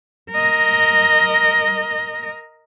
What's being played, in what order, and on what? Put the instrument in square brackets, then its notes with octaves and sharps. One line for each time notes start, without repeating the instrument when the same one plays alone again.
[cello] A#4 D#5